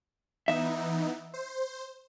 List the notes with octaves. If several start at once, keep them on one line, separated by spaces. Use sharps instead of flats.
E3 B3 D#4 E5
C5